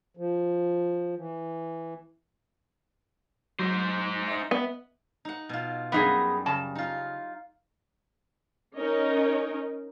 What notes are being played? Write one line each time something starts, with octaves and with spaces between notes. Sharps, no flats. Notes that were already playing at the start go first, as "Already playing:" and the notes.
F3
E3
F#3 D#4 C5
D#5 E5
B3
D#4 F#5
B2 F4
F#2 G3 B3 D#4 G#4 C6
C#3 A5
D#4 F4
C#4 D#4 A#4 C#5 D#5